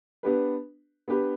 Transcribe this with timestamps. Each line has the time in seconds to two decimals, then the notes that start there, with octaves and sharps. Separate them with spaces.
0.23 B3 D4 G4 B4
1.08 B3 D4 G4 B4